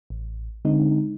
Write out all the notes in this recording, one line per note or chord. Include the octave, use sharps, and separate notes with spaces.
A1
D3 G#3 C4 D#4